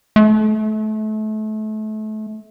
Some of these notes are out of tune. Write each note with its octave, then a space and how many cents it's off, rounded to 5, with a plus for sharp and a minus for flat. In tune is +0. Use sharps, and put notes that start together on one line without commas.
A3 -30